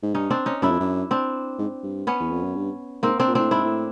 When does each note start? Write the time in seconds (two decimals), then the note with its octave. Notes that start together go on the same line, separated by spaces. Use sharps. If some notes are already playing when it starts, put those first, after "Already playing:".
0.03 G#2
0.14 G2 C#4 D#4
0.30 C4 D4
0.46 C#4 D#4
0.62 F#2 D4 E4
0.71 F2
0.80 F#2
1.11 C4 D4
1.59 G#2
1.83 G2
2.07 B3 C#4
2.20 E2
2.31 F2
2.44 F#2
2.55 G2
3.03 G#2 A#3 C4
3.19 C4 D4
3.28 A#2
3.35 A2 C4 D4
3.51 G#2 D4 E4
3.64 A2